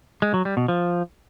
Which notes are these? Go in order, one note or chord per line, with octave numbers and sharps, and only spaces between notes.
G#3
F#3
G3
B2
F3